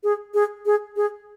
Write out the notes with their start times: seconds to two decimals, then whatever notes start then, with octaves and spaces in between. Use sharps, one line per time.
0.04 G#4
0.34 G#4
0.66 G#4
0.96 G#4